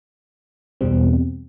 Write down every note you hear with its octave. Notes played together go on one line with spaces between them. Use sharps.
E2 B2 G3 C4